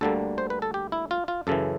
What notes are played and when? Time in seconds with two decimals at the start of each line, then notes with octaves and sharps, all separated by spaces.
0.01 D2 D3 G3 A#3 A4
0.38 C5
0.50 B4
0.62 A4
0.74 G4
0.92 E4
1.11 F4
1.28 F4
1.47 F#2 C#3 E3 A4